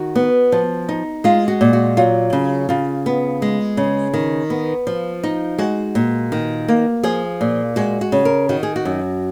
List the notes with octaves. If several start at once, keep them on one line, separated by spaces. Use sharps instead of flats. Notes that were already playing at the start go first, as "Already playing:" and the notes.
Already playing: D#3 F#4
B3
F3
D#4
G#3 F4
F#4
A#2
F#4
F#3 F4
C#3
C#3 F4
B3
G#3
C#3
D#3
B3
F3
D#4
G#3 F#4
A#2
D#3
A#3
F3 G#4
A#2
G#3 F#4
F#4
C#3
A#4
D#3 F#4
G#4
F#4
F#2